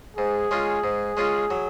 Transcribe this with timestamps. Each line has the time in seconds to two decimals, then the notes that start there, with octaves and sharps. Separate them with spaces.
0.17 G#2 G#4
0.51 G#3 C#4 F4
0.84 G#2
1.17 G#3 C#4 F4
1.50 F#3